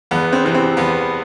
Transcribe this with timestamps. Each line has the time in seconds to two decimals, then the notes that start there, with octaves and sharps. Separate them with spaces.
0.11 E2 B3
0.33 C4
0.43 C3 E3
0.55 C4
0.77 E2 B3